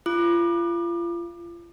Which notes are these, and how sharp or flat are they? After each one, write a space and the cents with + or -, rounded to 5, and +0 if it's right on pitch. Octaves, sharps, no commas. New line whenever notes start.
F4 -35 D6 +30